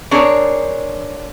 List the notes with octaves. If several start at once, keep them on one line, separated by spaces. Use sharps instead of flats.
C4 D4 G#4 A#4 C#5